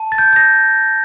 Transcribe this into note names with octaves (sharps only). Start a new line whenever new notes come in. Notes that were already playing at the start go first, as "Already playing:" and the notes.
Already playing: A5
A6
G6
G6 A#6